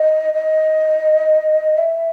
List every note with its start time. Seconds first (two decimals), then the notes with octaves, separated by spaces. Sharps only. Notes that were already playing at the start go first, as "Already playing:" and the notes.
Already playing: D#5
0.34 D#5
1.78 E5